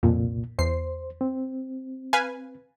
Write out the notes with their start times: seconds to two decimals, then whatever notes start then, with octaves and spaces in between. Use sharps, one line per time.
0.03 C2 F2 A#2
0.59 E2 C5 C7
1.21 C4
2.13 B4 F5 G#5